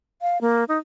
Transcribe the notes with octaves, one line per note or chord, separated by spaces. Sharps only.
F5
A#3
D#4